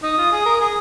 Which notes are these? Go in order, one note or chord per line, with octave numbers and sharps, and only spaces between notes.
D#4 D#6
F4
G#4
A#4
G#4 D#6